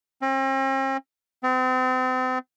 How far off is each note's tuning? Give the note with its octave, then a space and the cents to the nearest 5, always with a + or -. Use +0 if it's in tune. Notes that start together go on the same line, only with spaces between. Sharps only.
C4 +45
C4 -35